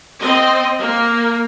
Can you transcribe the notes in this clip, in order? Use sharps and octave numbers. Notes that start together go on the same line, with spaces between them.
C4 D#5
A#3